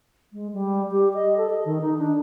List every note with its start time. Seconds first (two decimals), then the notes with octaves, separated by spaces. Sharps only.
0.33 G#3
0.53 G3
0.92 G4
1.14 D#5
1.37 A4
1.50 D#5
1.65 D#3
1.81 D#4
1.98 D4